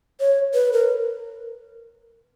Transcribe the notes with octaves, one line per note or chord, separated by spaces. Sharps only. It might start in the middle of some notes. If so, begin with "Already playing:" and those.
C#5
B4
A#4